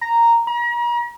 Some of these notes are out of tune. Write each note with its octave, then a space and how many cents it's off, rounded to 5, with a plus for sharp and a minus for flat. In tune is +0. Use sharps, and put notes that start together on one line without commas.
A#5 -5
A#5 +40